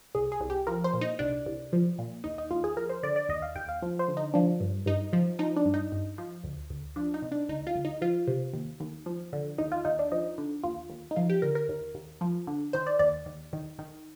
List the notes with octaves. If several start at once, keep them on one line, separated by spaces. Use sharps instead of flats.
C2 G#4
G#4
C2
G4
F3 A#4
C5
A#2
D#4
C2 D4
C2
F3
A#2
D#2 D#4
D#4
D#2 F4
G#4
F3 A#4
C5
D3 D5
D5
D#2 D#5
F5
D#2 G5
F5
F3
C5
D3
D#4
F3 D4
G2
G2 D#4
F3
F3 D#4
D4
G2
D#4
G2
F3
D2
D2
F3 D4
D#4
C3
D4
D2 D#4
F4
D2
D#4
F3 F4
C3
D#2
D#2
F3
D3
D#2 D#4
F4
D#2 D#4
D4
F3 D#4
D3
D#2 F4
D#2
D#4
F3 F4
G4
D3 A#4
A#4
D#2
D#2
F3
D3
D#3 C5
D5
D#2 D5
D#2
D#3
D#3